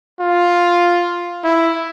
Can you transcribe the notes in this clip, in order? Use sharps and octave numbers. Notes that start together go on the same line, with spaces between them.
F4
E4